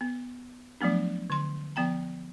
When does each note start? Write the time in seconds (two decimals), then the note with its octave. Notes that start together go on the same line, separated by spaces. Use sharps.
0.01 B3
0.81 F3 F#3 A3 B3 D4
1.30 D3 C6
1.76 F3 B3 G5 A#5